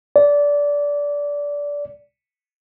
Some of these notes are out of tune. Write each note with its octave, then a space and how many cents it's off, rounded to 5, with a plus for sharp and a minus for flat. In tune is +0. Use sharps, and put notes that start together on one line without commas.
D5 -20